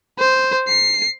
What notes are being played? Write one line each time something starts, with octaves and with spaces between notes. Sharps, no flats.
C5
C7